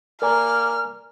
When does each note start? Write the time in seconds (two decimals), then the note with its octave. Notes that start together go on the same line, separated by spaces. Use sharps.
0.22 A#3 A#4 D5 G#5 A#5 F6